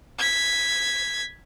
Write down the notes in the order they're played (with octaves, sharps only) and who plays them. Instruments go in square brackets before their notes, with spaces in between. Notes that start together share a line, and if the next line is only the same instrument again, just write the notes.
[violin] G#6 B6